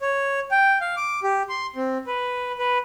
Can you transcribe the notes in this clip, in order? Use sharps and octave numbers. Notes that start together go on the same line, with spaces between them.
C#5
G5
F5
D6
G4
C6
C4
B4
B4